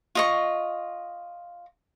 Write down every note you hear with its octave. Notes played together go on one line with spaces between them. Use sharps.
F4 D#5 C#6